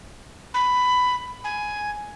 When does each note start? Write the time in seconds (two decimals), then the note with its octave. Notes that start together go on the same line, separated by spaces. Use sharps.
0.54 B5
1.44 G#5